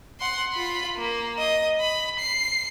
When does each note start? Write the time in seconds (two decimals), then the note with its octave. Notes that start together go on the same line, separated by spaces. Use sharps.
0.20 F#5 C6
0.53 F4 B5
0.97 A#3
1.39 D#5
1.80 B5
2.19 C7